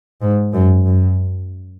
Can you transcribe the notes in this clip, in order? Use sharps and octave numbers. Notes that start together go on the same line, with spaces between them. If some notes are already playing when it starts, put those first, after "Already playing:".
G#2
F#2
F#2